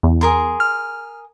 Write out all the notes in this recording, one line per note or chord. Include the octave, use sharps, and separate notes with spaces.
E2
G#4 A#4 C6
F6